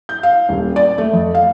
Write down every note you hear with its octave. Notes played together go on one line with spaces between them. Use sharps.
G6
F5
D#1
D5
A3
F2
F5